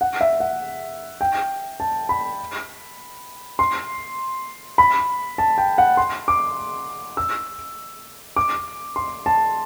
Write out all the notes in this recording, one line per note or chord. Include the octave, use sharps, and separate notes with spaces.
F#5
E5
F#5
G5
A5
B5
C6
B5
A5
G5
F#5
C6
D6
E6
D6
C6
A5